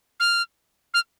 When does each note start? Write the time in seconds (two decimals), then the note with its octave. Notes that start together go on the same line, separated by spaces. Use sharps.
0.20 F6
0.94 F6